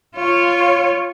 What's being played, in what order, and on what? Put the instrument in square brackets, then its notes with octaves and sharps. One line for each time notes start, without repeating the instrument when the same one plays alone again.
[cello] F4 C#5